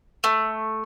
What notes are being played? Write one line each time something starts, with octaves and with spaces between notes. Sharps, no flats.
A3